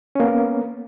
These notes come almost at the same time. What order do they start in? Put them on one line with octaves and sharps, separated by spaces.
C#4 A#3 B3 A#4